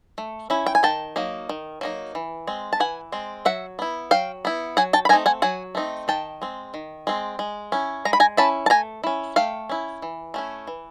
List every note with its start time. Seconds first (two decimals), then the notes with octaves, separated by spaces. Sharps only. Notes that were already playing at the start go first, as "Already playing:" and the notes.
0.18 A3
0.50 C#4 E4
0.66 G5
0.75 G#5
0.83 D#3 G5 A5
1.16 F#3 A#3 D#4
1.49 D#3
1.81 F#3 A#3 D#4
2.15 E3
2.47 G#3 C4
2.73 A5
2.80 E3 F#5 G#5
3.12 G#3 C4
3.45 F#3 E5 F#5
3.79 B3 E4
4.11 F#3 F5 G5
4.45 B3 E4
4.77 F#3 F#5 G#5
4.93 G5 A5
5.05 B5
5.09 A3 C4 D#4 G#5 A#5
5.26 F#5 G#5
5.42 F#3 F#5 G#5
5.75 A3 C4 D#4
6.08 D#3 G5 A5
6.42 G#3 C4
6.74 D#3
7.07 G#3 C4
7.39 G#3
7.72 C#4 E4
8.05 G#3 A#5
8.13 B5
8.20 G#5 A#5
8.37 C#4 E4 A5 B5
8.66 A5
8.70 A3 G#5 A#5
9.04 C#4 E4
9.36 A3 F5 G5
9.69 C#4 E4
10.02 E3
10.34 A3 C#4 E4
10.67 E3